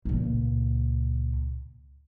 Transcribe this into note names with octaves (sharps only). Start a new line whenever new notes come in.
C#2 A#2